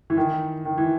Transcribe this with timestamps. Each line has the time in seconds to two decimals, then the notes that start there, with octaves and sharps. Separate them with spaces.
0.10 E3
0.17 D#3
0.65 D#3
0.78 E3